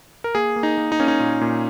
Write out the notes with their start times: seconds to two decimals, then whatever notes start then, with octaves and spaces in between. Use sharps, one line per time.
0.24 A#4
0.35 A#3 G#4
0.56 A#3
0.63 D#4
0.78 A#3
0.92 D#4
0.99 A#3 C#4
1.08 D#4
1.20 A#2
1.41 A#2